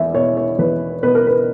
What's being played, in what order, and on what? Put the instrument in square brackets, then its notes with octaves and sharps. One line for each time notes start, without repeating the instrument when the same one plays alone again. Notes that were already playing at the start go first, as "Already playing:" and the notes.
Already playing: [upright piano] E2 E5
B2 C#5
C#5
E2 B4
B2 B4
A#4
B4